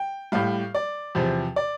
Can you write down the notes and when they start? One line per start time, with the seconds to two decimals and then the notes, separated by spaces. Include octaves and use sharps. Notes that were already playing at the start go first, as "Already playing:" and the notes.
Already playing: G5
0.32 A2 G3 F5
0.75 D5
1.15 E2 C3 F3
1.56 D5